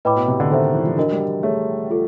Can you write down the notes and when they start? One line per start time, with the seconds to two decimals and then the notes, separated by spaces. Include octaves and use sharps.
0.05 A2 B4 D#5 G5 B5 D6
0.16 B2
0.28 C3
0.40 D3
0.50 D#3 A4 C5 E5
0.74 E3
0.86 F3
0.97 D4 F#4 A#4 D#5
1.12 G3
1.43 A3 G#4 C#5 E5
1.90 F4 A4